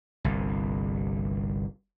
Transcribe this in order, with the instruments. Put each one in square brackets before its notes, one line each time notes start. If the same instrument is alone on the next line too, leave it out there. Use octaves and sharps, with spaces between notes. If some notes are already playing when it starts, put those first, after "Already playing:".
[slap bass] G1 C2